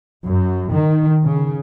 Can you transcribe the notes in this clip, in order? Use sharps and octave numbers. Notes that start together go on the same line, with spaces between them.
F#2
D#3
C#3